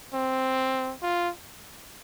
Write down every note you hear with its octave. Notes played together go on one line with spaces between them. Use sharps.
C4
F4